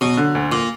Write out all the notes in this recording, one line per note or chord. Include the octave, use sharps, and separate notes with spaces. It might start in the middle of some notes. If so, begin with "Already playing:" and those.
B2 F#3
D3
D2
A#2